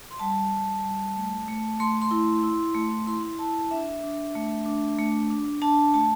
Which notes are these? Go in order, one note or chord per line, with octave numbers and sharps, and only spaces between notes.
C6
G3 A5
G3
G3
A3
A3
A3 C6
C6
E4
E4
A3
E4 C6
C6
E4 A5
D4 E5
D4
A3
D4
A3
D4
D4 A5
A3 A5